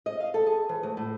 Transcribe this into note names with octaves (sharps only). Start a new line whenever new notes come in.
D#5
F5
A4
G#4
E3
D2
A2